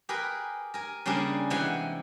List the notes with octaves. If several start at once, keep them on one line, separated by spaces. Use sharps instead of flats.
G4 G#4 A#4 B4
A#4 G#5
C#3 G3 A#3 D4 G#4
C3 E3 G#3 G4 F#5 G#5